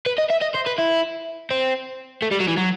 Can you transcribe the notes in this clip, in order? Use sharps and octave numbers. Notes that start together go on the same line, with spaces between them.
B4
D#5
E5
D#5
C5
B4
E4
C4
A3
G3
F#3
E3
F#3